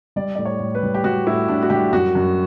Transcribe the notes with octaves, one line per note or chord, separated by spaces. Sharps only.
G3 D5
A2 D5
C#5
A2
B4
G3
G4
G3 F#4
A2 E4
A2 D4
F#4
G3 G4
F#2 F#4
F#2